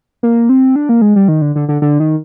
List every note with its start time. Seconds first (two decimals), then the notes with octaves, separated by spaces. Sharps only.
0.23 A#3
0.49 C4
0.76 D4
0.89 A#3
1.02 G#3
1.16 G3
1.28 D#3
1.42 D3
1.56 D3
1.69 D3
1.82 D3
2.00 D#3